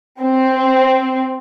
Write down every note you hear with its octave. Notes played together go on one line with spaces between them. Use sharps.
C4